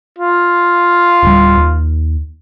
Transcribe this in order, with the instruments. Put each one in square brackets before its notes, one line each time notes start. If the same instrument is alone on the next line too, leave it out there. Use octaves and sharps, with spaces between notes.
[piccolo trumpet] F4
[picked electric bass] D1 G3
D#2